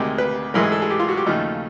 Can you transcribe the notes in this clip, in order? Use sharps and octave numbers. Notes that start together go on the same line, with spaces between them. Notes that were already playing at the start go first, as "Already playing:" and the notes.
Already playing: D2 C3 D#3 G#3 G4
B4
A1 G#2 E3 G#3 A#4
G#4
A4
G#4
G4
F4
F#4
G4
D#2 C#3 F3 A3 D#4